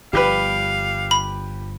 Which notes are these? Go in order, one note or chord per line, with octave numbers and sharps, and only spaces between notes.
G1 F3 G3 G4 B4 F5
B5